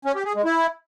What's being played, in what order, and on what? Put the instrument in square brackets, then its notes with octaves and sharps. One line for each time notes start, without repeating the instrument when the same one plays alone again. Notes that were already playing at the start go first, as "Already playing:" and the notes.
[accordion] C#4
G4
G#4
G#3
E4